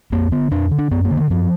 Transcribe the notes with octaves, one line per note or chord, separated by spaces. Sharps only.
F2 A#3
D3 B3
F2 D4
D3
D4
F#2 B3
A#3
D3
D#3
F#2 F3